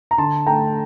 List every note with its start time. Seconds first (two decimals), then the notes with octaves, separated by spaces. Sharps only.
0.11 A#5
0.18 D3 A5 C6
0.46 A3 G5 A#5